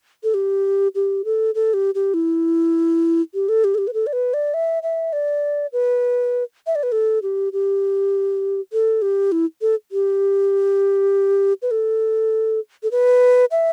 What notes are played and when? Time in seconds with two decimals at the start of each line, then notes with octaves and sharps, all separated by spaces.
0.23 A4
0.34 G4
0.95 G4
1.25 A4
1.55 A4
1.74 G4
1.95 G4
2.14 E4
3.34 G4
3.49 A4
3.64 G4
3.75 A4
3.78 G4
3.87 B4
3.94 A4
4.07 D5
4.13 B4
4.34 D5
4.54 E5
4.83 E5
5.13 D5
5.73 B4
6.67 E5
6.75 D5
6.83 B4
6.92 A4
7.23 G4
7.53 G4
8.73 A4
9.02 G4
9.32 E4
9.61 A4
9.92 G4
11.62 B4
11.71 A4
12.83 A4
12.91 B4
13.51 E5